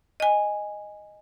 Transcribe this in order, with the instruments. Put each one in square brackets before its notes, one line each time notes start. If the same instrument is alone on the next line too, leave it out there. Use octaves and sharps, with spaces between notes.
[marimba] D#5 G#5